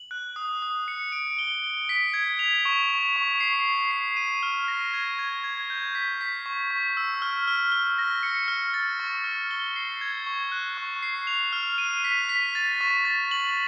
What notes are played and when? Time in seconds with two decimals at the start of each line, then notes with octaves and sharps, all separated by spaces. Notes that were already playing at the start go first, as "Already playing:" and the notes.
Already playing: F#7
0.11 F#6
0.36 D#6
0.62 D#6
0.88 C#7
1.12 D7
1.39 G7
1.64 G7
1.89 B6
2.14 G#6
2.39 F7
2.65 C#6
2.90 C#6
3.16 C#6
3.40 C7
3.66 C7
3.91 C7
4.17 D#7
4.43 F6
4.68 A#6
4.94 G#6
5.19 G#6
5.44 G#6
5.70 G6
5.95 B6
6.21 B6
6.46 C#6
6.71 C#6
6.97 E6
7.22 F6
7.48 F6
7.72 F6
7.98 A#6
8.23 C#7
8.48 F6
8.74 A6
9.00 C#6
9.24 F6
9.51 G7
9.76 C7
10.01 G#6
10.26 C#6
10.52 F#6
10.78 C#6
11.03 C7
11.27 F7
11.53 F6
11.78 D#7
12.04 B6
12.29 B6
12.55 A6
12.81 C#6
13.05 A6
13.31 F#7